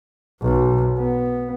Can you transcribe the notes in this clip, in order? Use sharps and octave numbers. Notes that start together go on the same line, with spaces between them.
B1
B3